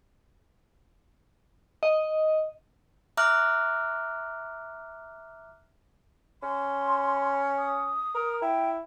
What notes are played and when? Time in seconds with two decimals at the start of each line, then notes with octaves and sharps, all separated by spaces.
1.83 D#5
3.17 E5 A#5 D6 F6 F#6
6.43 C#4 C6
7.58 D#6
8.15 A#4
8.42 E4 G5